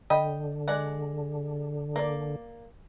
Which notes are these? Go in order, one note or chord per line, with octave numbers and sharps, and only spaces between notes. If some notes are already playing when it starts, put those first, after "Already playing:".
D3 D#5 G5 B5
G#3 D5 F#5
A#3 D5